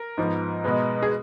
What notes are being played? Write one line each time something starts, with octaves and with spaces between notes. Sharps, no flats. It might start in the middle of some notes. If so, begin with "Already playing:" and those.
Already playing: A#4
G#2 F3 B3
B2 G#3 B3
G#4